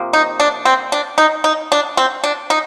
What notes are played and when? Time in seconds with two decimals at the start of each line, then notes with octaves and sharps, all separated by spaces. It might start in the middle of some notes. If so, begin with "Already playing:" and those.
Already playing: C3 F3 A#3
0.13 D#4
0.40 D4
0.65 C4
0.92 D4
1.18 D#4
1.44 D#4
1.72 D4
1.97 C4
2.24 D4
2.50 D#4